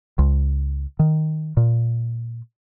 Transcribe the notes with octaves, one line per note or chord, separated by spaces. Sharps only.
C#2
D#3
A#2